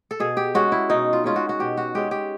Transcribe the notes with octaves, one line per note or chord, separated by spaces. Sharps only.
A4
B2 G#4
G4
G#3 C#4 F#4
E4
B2 D#4
F4
G#3 C#4 F4
F#4
F#4
B2 G4
F#4
G#3 C#4 G4
G4